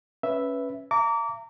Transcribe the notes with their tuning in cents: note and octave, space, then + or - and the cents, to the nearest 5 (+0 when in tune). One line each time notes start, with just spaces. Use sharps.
C#4 +0 B4 +0 E5 +0
E5 +40 A#5 -25 D6 -30